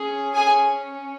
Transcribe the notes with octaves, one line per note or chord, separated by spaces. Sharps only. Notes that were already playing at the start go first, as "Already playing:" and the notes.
Already playing: C#4 G#4
G#4 G#5